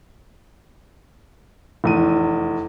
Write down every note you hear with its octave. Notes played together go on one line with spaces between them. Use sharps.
F1 E2 D#7